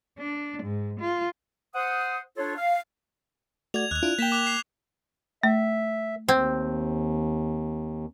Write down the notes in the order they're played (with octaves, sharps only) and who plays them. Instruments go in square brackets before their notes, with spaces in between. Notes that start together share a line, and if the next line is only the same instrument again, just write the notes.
[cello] D4
G#2
F4
[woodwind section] C5 F#5 D#6
D4 F4 A4 C#5
F5
[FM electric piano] A3 F#4 D5 [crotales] G#6 F7
[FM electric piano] D#2 [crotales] F#6 F7
[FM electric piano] D4 E4 F4
[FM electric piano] A#3 G5 [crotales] B6 E7 G7
[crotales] D6 F#6 F7
C7
[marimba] A3 [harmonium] E5
[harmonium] D#2 [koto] C4